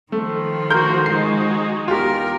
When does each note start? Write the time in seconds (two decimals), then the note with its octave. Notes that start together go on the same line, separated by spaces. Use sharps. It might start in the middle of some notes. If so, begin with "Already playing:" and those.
0.12 D#3 F3 A3
0.70 A3 F#4 A#4 C6 G6
1.06 G#3 D#4 F#4 C7
1.88 E2 F4 G4 A#4